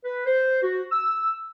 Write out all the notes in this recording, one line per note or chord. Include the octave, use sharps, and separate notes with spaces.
B4
C5
F#4
E6